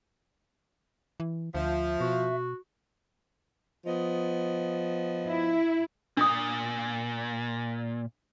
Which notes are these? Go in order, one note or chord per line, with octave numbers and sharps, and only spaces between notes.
E3
D2 F3 E5
B2 F#4
F3 B3 D#5
E4
A#2 D4 D#6